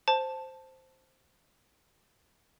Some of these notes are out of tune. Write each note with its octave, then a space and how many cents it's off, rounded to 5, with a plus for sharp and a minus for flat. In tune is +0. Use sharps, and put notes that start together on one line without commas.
C5 +0 A5 +0